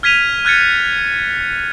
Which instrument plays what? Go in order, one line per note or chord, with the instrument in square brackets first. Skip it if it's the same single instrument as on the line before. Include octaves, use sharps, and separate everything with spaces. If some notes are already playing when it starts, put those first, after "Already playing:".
[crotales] F6 G#6 B6 D#7 F7
F6 F#6 G#6 A6 C#7